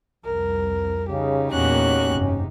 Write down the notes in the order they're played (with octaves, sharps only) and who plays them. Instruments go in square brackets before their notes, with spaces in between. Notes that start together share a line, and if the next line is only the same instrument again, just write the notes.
[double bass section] C2 F2 [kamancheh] A#4
[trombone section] C#3 [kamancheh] D#4 G4
[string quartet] E2 F#4 F#6 [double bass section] A#2 A#3 [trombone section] C#4
[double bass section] F#1 G#2 C3